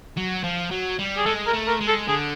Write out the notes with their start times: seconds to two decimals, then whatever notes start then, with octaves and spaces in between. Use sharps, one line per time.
0.17 F#3
0.44 F3
0.71 F#3
0.99 G3
1.17 G#4
1.26 G#3 A4
1.46 A#4
1.53 A3
1.67 A#4
1.81 G#3
1.88 A4
2.08 D3 G#4